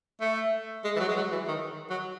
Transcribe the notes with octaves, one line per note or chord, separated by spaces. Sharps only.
A3
G#3
E3
F#3
G#3
F#3
E3
D#3
F#3